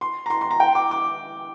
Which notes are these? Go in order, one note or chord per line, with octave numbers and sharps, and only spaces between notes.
C6
A#5
C6
C6
A#5
G5
D6
D6